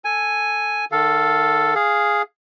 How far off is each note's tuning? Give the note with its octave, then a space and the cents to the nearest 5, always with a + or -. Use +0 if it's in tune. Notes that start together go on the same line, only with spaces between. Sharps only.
A4 +0 G#5 +0
D#3 -25 A4 +0 F5 +0
G#4 +0 F5 +0